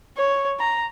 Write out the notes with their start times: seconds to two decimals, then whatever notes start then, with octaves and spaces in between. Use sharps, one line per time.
0.17 C#5
0.59 A#5